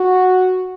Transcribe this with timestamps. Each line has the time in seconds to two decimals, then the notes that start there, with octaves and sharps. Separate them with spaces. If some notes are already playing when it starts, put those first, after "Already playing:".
Already playing: F#4